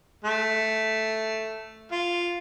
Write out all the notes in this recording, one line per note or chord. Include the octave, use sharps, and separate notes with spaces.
A3
F4